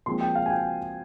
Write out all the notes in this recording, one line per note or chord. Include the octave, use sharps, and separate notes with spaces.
A#2 F3 G#3 C4 D#4 C6
G5
F5
G#5
G5